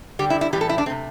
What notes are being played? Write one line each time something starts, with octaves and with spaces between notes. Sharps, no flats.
D3 G3 G4
E4
E4
A2 E3 G3 G4
A4
E4
D4
C3 A3 C4